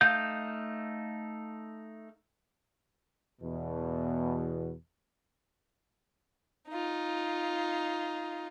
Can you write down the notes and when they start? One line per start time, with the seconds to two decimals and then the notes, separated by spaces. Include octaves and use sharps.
0.01 A3 D#4 F5 G6
3.41 E2 B2
6.68 D#4 F4